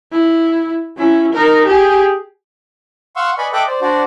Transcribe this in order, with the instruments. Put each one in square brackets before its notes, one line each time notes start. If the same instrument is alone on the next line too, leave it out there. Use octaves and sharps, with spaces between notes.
[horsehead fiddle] E4
C#4 E4
D#4 A#4
G4 G#4
[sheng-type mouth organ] F5 F#5 C6 C#6 E6
B4 D5 D#5 G#5 B5 C#6
A4 D#5 E5 G5 D6 F#6
C5 D5
D4 F#4 C5 D5